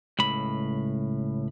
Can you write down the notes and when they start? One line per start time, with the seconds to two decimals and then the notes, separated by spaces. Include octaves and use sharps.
0.19 C#2 A2 B5